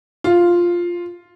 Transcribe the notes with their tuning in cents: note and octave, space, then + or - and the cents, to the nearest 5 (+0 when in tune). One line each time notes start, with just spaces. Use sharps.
F4 +0